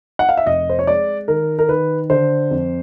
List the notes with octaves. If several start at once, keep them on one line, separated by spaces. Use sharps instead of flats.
F#5
F5
E5
F1 D#5
C5
C#5
G#3 D5
D#3 A#4
A#4
D#3 B4
D3 C5
F2